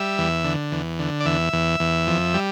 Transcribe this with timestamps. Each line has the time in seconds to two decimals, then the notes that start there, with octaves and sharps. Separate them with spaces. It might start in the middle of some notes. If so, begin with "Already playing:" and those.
Already playing: G3 E5
0.18 E2
0.44 D3
0.72 E2
0.99 D3
1.20 D5
1.25 E2 E5
1.53 E2
1.80 E2
2.07 F2
2.34 G3